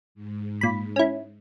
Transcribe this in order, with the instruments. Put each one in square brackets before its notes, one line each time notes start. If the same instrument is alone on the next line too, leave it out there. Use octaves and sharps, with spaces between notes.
[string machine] G#2
[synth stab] A#2 B5
C#4 E4